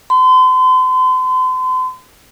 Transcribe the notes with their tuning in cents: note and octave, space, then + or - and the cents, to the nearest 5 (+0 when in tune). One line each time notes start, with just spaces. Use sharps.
C6 -40